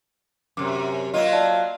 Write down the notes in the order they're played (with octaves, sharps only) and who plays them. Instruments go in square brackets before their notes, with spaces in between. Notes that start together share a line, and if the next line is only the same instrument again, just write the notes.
[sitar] F#2 C3 [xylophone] D6
[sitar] F#3 A#3 F4 [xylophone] D#5
[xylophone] D5 F5 A5